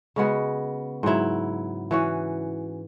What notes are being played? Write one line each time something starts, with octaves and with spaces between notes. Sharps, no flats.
C#3 G#3 B3 F#4
G#2 F#3 E4
E3 C#4 F#4